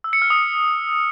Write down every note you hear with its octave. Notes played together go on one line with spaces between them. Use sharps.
E6
C#7
F6
D#6